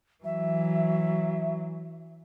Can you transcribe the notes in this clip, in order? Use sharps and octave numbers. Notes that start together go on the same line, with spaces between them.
E3 F#3 E5